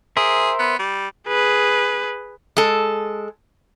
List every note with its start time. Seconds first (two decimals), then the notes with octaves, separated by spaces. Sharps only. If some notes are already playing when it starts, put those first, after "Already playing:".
0.17 G#4 A#4 C5 E5
0.59 B3
0.79 G3
1.28 G#4 B4
2.57 G#3 A4